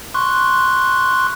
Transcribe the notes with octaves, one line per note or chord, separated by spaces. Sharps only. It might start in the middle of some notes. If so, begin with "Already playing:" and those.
C6 C#6 F#6